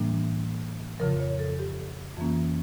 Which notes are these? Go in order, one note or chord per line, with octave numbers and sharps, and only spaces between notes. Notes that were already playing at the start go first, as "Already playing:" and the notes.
Already playing: A2 E3 G3 A#3 D4
F2 C#3 F3 A#4
C#5
A4
G4
F2 E3 A#3 C#4